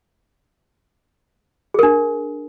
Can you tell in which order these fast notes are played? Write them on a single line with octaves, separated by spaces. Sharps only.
G#4 A#4 D4